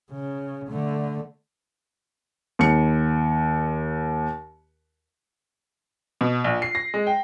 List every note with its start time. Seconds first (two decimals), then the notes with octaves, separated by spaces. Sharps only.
0.12 C#3
0.69 D3 A3
2.59 D#2 C#7
6.21 B2
6.44 A#1
6.62 C7
6.75 A#6
6.94 G#3
7.07 G5